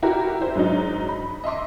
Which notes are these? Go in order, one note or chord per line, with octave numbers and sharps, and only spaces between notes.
E4 F#4 G4 A#4
E4 C5 E5
G#2 F#3 D4 D#4
B5
D#5 E5 C6 D6